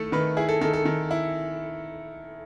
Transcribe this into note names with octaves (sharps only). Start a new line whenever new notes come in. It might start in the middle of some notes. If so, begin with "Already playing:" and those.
Already playing: D#3 A3 E4 A4
D#3 B4
E4 G#4
A4
D#3 A4
A4
D#3
E4